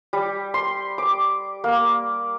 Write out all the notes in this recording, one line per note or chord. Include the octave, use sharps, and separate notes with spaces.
G3
C6
D6
A#3